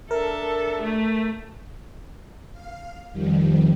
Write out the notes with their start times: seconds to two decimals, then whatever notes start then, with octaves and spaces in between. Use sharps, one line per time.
0.11 D4 A4 A#4 E5
0.82 A3
2.52 F5
3.12 F2 D#3 F3 G3